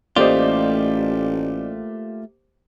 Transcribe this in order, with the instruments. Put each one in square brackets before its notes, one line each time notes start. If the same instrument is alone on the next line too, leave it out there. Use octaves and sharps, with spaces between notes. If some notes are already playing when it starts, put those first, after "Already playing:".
[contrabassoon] A1 [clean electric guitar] A3 F4 [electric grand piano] A#3 G4 C5 [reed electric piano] D5 D#5